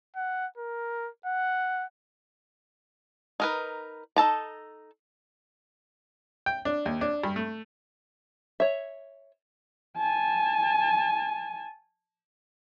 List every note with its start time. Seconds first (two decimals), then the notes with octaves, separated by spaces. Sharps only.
0.16 F#5
0.57 A#4
1.26 F#5
3.40 D#4 A#4 B4
4.16 D#4 A4 A5 A#5
6.46 G5
6.65 D4
6.86 D#2
7.01 D4
7.24 G2
7.36 A3
8.60 C#5 E5
9.97 G#5 A5